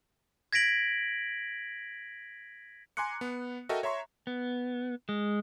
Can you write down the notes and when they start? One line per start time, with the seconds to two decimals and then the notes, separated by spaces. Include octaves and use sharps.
0.53 G#6 A#6 B6 D7 F#7
2.97 G#5 A#5 C6 D6 F#6 C#7
3.21 B3
3.69 F#4 A4 A#4 D#5 E5 G5
3.83 C#5 E5 A#5 C6 C#6
4.27 B3
5.09 G#3